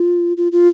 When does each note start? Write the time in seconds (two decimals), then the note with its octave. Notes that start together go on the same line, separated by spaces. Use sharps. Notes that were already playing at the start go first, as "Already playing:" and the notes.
Already playing: F4
0.37 F4
0.52 F4